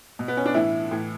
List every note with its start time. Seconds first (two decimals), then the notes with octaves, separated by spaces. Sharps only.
0.19 B2
0.28 B3
0.37 C#4
0.45 D4
0.54 A2 E3 E4
0.91 A2 E3